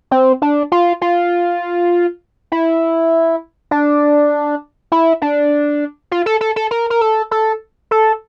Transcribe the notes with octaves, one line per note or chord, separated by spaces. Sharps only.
C4
D4
F4
F4
E4
D4
E4
D4
F4
A4
A4
A4
A#4
A#4
A4
A4
A4